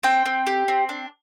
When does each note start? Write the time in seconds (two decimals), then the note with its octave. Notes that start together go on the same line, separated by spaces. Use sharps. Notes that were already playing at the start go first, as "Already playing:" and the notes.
0.03 C4 G5
0.26 C4
0.47 G4
0.68 C4
0.89 D4